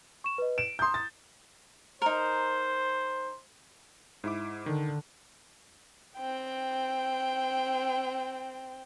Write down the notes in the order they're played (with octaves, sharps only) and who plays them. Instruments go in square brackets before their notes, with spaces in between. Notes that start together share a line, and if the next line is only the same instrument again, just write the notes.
[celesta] C#6 E7
B4 D#5
[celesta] D7 [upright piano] E7
[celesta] A#5 D#6 [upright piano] C6 G6
[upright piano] A6
[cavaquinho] D#4 A#4 [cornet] C5
[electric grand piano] G#2 E4 D6
[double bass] D3 [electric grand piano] D#3
[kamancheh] C4 G5